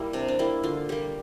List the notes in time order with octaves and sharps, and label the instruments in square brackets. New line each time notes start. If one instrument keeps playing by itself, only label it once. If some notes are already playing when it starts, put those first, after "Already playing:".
Already playing: [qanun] G3 A#3 E4
C3 D4
D4
G3 A#3 E4
D3 F4
G3 A#3 G4